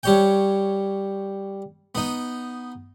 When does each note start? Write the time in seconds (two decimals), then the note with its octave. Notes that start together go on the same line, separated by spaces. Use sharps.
0.03 G3 C#5 G5
1.95 B3 D#4